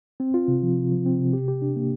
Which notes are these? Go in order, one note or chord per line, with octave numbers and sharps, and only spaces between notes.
C4
F4
C3
F3
C3
F3
C4
C3
G4
G4
D4
A#3